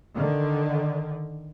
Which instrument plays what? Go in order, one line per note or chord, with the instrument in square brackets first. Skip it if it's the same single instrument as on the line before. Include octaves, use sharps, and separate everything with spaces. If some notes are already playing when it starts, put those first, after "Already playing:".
[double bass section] D3 D#3